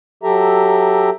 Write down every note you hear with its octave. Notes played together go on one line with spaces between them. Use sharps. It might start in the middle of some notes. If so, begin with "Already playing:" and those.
F#3 G4 A4 E5 A#5